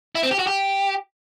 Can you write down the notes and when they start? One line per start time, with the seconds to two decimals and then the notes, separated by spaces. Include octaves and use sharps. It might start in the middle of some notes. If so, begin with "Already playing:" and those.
0.15 E4
0.23 C4
0.31 G4
0.39 F#4
0.47 G4